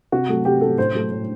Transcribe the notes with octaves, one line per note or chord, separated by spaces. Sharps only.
C3 F#4
F#3 A3
C3 G4
F#3 A3 A4
A2 C5
F#3 A3
A2